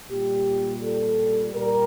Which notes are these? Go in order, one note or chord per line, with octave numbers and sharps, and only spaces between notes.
A#2 G3 G4
A4
A#2 G3 A#4